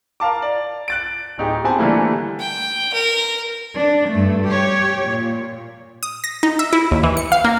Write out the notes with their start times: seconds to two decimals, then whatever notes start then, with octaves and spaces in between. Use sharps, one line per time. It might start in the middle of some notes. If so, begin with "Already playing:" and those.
0.20 A#4 F5 A5 D6
0.42 D5
0.88 F#6 A6 D7
1.38 D1 D#4 G4 G#4
1.64 B3 C4 G4 G#4 G#5 A5
1.78 D3 E3 G3 A3 A#3 E4
2.39 G5
2.93 A#4
3.76 D4
4.11 G2 A3
4.46 G4 C#5
5.10 A#2
6.03 D#6
6.24 A#6
6.43 D#4
6.59 E5
6.73 E4
6.91 D#2
7.03 E3
7.17 C#7
7.32 F5
7.44 A#3